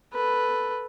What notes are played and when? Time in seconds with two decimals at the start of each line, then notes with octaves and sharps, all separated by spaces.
0.13 A4 B4